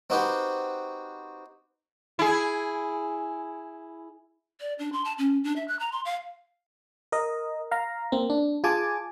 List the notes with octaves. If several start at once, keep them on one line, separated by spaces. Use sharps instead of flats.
C4 D#4 F#4 G4 B4 C5
E4 G#4
D5
D4
C6
A5
C#4
D4
E5
F#6
A#5
C6
F5
A#4 D#5
F5 A#5
A#3 C4
D4
F4 G#4 G#5 A5 D6